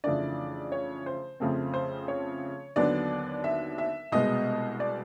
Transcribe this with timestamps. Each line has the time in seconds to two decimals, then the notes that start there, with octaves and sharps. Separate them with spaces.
0.04 F2 C#3 E3 A3 D4 D5
0.72 C#5
1.06 C5
1.40 F2 C#3 F3 A3 C4
1.74 C5
2.08 C#5
2.76 D#2 D3 F#3 B3 D4 D5
3.44 E5
3.78 E5
4.12 C2 B2 G#3 B3 D#5
4.80 D5